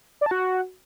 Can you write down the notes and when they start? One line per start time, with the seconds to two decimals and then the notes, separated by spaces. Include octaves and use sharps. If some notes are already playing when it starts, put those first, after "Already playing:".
0.21 D5
0.26 A5
0.31 F#4